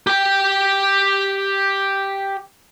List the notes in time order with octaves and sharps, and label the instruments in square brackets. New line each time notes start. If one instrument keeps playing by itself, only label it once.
[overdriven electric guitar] G4 G5